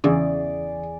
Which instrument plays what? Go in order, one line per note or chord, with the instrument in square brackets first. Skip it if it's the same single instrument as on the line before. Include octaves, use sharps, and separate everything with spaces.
[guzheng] E2 [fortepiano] C#3 [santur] G#4 D5